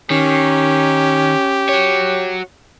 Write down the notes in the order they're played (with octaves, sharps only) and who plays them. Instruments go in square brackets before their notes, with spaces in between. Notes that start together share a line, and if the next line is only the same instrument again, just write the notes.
[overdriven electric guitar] D#3 [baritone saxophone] C#4 [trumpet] G4
[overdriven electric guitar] F#4 C#5